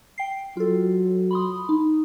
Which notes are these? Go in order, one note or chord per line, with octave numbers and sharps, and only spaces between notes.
G5 C7
F#3 F4 A4
B5 C6 D#6
D#4